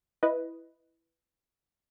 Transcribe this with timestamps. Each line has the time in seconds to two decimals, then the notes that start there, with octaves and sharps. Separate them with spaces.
0.23 E4 B4 D#5